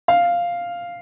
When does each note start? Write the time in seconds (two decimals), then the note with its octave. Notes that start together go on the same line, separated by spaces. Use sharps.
0.08 F5